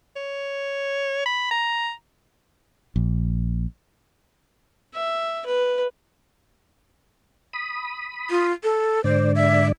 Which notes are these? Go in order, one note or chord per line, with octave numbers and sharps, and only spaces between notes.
C#5
B5
A#5
A#1
E5
B4
B5 D#6
F4
A4
G#2 D3 C5 D5
E5